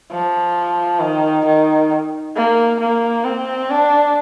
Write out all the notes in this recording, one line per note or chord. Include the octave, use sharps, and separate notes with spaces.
F3
D#3
D#3
A#3
A#3
C4
D4